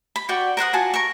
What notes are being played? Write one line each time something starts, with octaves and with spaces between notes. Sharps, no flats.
B5
F#4 D5 G5 C#6
A#4 C5 F#5 D#6
F4 F#4 G#5 A5
A#4 C#6